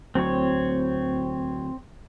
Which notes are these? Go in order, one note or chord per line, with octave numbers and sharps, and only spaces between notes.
D2 F#3 C4 C#5